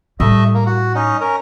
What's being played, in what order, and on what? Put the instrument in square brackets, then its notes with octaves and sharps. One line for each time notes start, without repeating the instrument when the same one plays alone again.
[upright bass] A2 G3 [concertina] A3 D#5 E5
[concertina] A#3
F#4
C#4 D#4
C#4 A#4